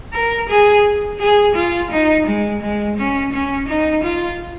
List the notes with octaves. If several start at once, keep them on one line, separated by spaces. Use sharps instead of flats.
A#4
G#4
G#4
F4
D#4
G#3
G#3
C#4
C#4
D#4
F4